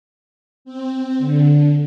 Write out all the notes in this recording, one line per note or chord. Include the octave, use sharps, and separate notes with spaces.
C4
D3